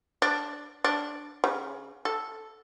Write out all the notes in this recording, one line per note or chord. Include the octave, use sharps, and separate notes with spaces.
D4
D4
C#3
A4